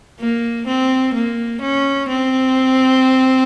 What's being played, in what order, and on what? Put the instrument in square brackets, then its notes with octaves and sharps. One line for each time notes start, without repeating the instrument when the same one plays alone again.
[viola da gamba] A#3
C4
A#3
C#4
C4